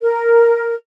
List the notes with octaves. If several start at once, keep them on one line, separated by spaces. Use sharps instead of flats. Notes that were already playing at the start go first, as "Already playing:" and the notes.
A#4